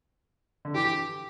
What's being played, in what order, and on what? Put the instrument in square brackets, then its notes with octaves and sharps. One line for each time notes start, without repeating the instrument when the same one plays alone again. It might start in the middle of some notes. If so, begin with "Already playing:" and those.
[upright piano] D3
[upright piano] E3 [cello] G4